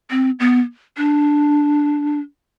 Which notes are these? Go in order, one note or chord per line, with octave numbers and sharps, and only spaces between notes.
C4
B3
D4